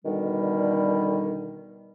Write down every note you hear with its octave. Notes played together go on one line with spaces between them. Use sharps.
B2 D3 D#3 G3